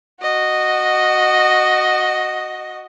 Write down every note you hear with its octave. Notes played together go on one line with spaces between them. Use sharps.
F#4 D#5